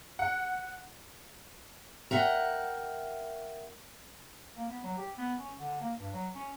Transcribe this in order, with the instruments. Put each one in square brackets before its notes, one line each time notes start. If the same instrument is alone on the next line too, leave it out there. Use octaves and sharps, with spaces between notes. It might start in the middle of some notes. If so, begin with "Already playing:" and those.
[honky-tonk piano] F#5
[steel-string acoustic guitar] A#4 E5 F#5 G5
[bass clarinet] A#3
B3
F#3
G4
B3
C#4
D3
A#3
G2
F#3
C#4